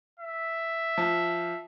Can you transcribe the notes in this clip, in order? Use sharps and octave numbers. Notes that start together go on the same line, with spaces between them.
E5
F3